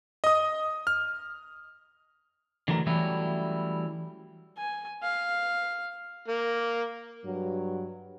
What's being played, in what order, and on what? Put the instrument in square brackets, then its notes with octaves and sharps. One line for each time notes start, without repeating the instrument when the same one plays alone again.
[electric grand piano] D#5 D#6
F6
[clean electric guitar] D3 E3 F#3 A3 A#4
E3 F#3 G3 A3 C#4 E4
[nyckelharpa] G#5
F5
[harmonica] A#3
[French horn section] G2 F#3